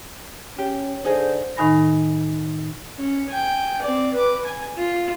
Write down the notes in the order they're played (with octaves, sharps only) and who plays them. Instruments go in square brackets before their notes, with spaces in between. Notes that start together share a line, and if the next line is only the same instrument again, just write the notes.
[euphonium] C#4 [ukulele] G4
[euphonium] D3 [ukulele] D#4 G#4 D#5 [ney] C5
[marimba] A2 D#3 D#4 G#5 B5 A#6
[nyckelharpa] C#4
G5 G#5
C4 D5
B4 D6
G#5
F4